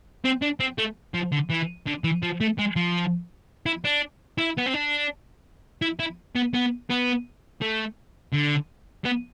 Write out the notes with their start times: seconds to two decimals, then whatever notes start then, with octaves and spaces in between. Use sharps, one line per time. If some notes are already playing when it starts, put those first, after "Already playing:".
0.25 C4
0.42 D4
0.60 C4
0.78 A3
1.14 F3
1.32 D3
1.50 E3
1.87 D3
2.04 E3
2.23 F3
2.41 A3
2.59 G#3
2.76 F3
3.66 E4
3.85 D4
4.38 E4
4.57 B3
4.66 C4
4.73 D4
5.82 E4
6.00 E4
6.36 B3
6.54 B3
6.90 B3
7.62 A3
8.34 D3
9.05 B3